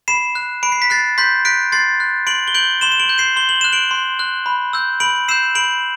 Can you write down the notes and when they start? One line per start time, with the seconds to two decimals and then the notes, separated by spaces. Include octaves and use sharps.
0.08 B5 C7 E7
0.35 F#6
0.63 B5 D7
0.72 C7
0.82 B6
0.90 F#6 A6 C7
1.18 C6 G6 B6
1.45 F#6 B6 D7
1.72 C6 A6 C7
2.00 F#6
2.27 C6 D7 F#7
2.48 G7
2.54 G6 D7 F#7
2.81 C6 E7 G7
2.92 E7
3.00 D7 F#7
3.09 G6
3.18 C7 E7
3.36 C6 G7
3.49 F#7
3.61 F#6 E7
3.73 D7 F#7
3.91 C6
4.19 F#6
4.46 B5
4.73 E6 G6
5.00 B5 D7 F#7
5.28 E6 G6 C7 E7
5.55 B5 D7 F#7